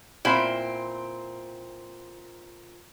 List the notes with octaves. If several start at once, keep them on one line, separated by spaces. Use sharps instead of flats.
A#2 C4 E4 B5